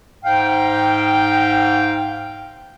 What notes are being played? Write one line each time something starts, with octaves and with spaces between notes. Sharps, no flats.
G#2 F5 G5